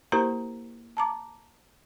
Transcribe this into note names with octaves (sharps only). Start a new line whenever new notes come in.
A#3 E4 G4 A#4 C5 A#5
A5 A#5 D6